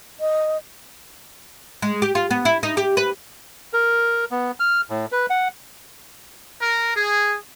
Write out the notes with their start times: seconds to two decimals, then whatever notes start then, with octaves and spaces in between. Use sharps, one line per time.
0.20 D#5
1.82 G#3
2.02 G4
2.15 F4
2.31 B3
2.45 E4
2.63 D#4
2.77 G4
2.97 B4
3.73 A#4
4.31 B3
4.60 F6
4.90 A2
5.12 B4
5.30 F#5
6.62 A#4
6.94 G#4